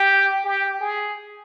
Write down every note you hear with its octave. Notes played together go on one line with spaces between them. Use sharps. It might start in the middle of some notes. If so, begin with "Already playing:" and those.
Already playing: G4
G4
G#4